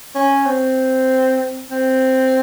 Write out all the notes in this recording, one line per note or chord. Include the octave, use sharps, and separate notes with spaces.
C#4
C4
C4